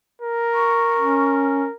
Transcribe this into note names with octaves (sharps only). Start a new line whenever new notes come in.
A#4
C#6
C#4